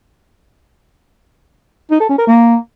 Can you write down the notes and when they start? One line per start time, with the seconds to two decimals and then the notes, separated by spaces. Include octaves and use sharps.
1.91 D#4
2.00 A4
2.09 C#4
2.18 A#4
2.27 A#3